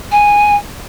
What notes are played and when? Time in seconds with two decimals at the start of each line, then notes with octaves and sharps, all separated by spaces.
0.11 G#5